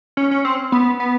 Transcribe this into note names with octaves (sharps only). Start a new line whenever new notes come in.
C#4
C#4
C4
B3
B3